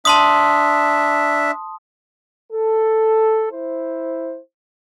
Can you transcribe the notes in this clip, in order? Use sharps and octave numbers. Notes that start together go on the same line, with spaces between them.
D4 E5 A5 C6 D#6
A4
E4 C5